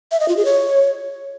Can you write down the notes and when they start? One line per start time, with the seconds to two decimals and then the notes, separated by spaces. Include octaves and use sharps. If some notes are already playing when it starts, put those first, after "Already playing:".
0.12 E5
0.20 D#5
0.28 F4
0.37 G#4
0.45 C#5